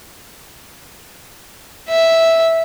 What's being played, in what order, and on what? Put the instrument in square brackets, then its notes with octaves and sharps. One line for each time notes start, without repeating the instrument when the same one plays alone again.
[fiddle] E5